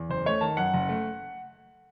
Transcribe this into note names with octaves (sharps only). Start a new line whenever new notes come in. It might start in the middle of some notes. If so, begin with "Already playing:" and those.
Already playing: E2
F#1 C5
A3 C#5
D#3 A5
F#2 F#5
F#1
A3